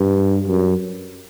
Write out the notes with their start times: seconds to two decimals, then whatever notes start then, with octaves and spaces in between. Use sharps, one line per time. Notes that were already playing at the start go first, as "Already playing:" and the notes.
Already playing: G2
0.47 F#2